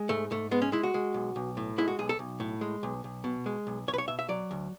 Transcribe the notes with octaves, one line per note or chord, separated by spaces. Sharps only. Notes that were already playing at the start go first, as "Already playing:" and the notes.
Already playing: G#3
G#2 A3
G#2 A3
G#3 B3
C#4
G#3 E4
F#4
G#3
B1
B1
A2
G#3 E4
F#4
B1 G#4
A4
B1
A2
G#3
B1
B1
B2
G#3
B1
B1 C#5
B4
C#5
B2 E5
E5
F#3 D5
D2